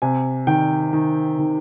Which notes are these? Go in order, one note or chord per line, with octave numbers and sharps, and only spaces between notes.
C3 G#5
D#3 G5
D#3
D#3